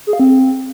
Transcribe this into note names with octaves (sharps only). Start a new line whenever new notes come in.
G#4
F5
C4